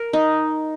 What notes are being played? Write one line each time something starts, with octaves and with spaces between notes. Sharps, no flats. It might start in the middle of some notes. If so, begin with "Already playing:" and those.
Already playing: A#4
D#4